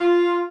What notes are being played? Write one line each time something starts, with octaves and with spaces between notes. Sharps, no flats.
F4